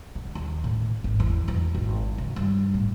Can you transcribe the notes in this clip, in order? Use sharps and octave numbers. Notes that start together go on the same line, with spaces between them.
D3
D#2
A2
G#1
E2
E3
G#1
C#3
G2
A2